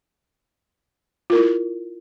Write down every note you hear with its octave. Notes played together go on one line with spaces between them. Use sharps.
E4 F4 A#4